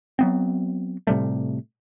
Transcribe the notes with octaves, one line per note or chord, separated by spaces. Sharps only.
F#3 B3 C4
A2 C3 G3 A3